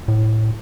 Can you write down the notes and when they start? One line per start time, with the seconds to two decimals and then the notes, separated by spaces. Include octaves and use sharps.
0.08 A2